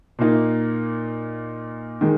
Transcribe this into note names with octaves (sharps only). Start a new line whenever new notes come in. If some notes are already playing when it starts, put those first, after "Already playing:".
A#2 A#3 D#4
D#3 G#3